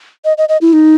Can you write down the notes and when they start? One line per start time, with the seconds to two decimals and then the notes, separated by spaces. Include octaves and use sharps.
0.25 D#5
0.38 D#5
0.49 D#5
0.61 E4
0.73 D#4